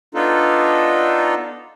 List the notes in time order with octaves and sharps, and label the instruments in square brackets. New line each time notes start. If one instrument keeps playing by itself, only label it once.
[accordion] B3 D4 D#4 F4 A4